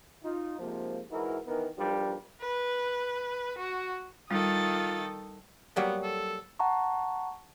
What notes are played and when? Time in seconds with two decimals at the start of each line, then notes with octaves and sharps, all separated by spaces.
0.23 D#4 F4
0.59 G#2 C3 F3 A#3
1.10 G#2 E3 E4 F#4 A#4
1.46 D#3 E3 B3 D#4 A#4
1.77 B1 F3 G3 D4 G4 A#4
2.41 B4
3.58 F#4
4.31 D#3 G3 F4 A4 D#6 A6
5.76 F#3 G3 A#3 B3
6.03 A4
6.59 F#5 A5 A#5 C#6